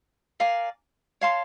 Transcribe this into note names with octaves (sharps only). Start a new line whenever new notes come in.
A#4 D5 F5 G#5
C#5 F5 A5 C6